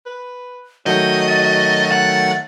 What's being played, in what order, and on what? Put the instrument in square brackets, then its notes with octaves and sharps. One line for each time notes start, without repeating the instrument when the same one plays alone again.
[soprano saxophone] B4
[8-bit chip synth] D#3 F#3 A3 [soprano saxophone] F#4 [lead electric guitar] D#5 [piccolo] G6
[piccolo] A6
[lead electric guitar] F#5